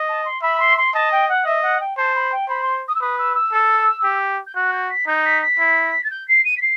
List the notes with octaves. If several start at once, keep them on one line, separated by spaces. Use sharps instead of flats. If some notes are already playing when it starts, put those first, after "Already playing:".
Already playing: D#5
A5
C6
E5 B5
C6
C6
D#5 A5
G5
F#5
D#5 E5
F#5
G5
C5 A5
B5
G5
C5 B5
C6
D#6
E6
B4 D#6
E6
E6
A4
G4
G6
F#4 F#6
G6
B6
D#4 G6
B6
B6
E4
A6
G6
C7
D#7
B6
C7